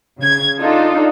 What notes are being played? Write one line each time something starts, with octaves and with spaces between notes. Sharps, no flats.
C#3 G#6
D4 D#4 F4 A4